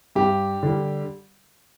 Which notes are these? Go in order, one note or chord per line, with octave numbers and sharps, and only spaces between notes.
G2 G4
D3 G3